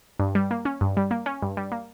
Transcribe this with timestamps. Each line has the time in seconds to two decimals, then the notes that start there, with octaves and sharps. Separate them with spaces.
0.20 G2
0.35 G3
0.51 A#3
0.65 C#4
0.81 G2
0.97 G3
1.11 A#3
1.26 C#4
1.42 G2
1.57 G3
1.72 A#3